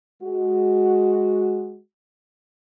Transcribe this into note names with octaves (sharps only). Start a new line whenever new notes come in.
G#3 F#4